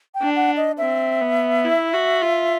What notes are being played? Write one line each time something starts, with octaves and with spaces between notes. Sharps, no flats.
G5
D4
F#5
D#5
C4 E5
B3
E4
F#4
F4